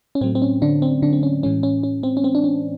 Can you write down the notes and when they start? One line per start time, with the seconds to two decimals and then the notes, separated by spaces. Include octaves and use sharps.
0.15 C#4
0.21 A2 F#3 A3 C4
0.35 C4
0.42 C#4
0.62 D3 D4
0.82 C4
1.02 D3 D4
1.13 C4
1.23 C#4
1.43 A2 E3 G#3 C#4
1.63 C#4
1.83 C#4
2.03 C4
2.17 C#4
2.24 C4
2.35 D4
2.44 C#4